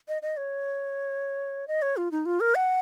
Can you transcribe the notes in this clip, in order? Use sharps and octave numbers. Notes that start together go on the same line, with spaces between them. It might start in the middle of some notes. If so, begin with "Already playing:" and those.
D#5
D#5
C#5
D#5
C#5
F4
D#4
F4
A#4
F#5